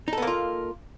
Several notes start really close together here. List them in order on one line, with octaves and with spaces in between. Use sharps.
D#4 A4 B3 A#3 F4